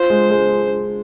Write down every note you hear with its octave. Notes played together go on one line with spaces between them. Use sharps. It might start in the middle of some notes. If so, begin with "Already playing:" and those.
Already playing: F4 C5
G#3
G#3